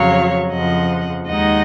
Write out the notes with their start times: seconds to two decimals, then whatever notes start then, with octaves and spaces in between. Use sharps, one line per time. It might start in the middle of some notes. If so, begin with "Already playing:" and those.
Already playing: F2 C#3 F#3 C#5 F5
0.51 F2 C#3 F3 D#5 F#5
1.28 D#2 D#3 G#3 D#4 D#5 F#5